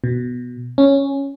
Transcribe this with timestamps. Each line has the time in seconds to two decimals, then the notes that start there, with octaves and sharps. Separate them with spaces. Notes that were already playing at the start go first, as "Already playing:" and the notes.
0.04 B2
0.78 C#4